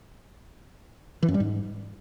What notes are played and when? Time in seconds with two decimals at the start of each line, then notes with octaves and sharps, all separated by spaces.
1.23 E3
1.28 F#2
1.34 G3
1.40 G#2